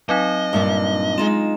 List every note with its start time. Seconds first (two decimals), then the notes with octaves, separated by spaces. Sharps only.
0.09 F#3 C4 D#4 D#5
0.53 G2 A#2 D5
1.18 G#3 D#4 F4 E7